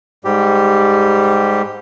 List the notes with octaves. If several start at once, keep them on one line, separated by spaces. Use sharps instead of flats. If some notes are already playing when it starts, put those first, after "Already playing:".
G#2 G3 G4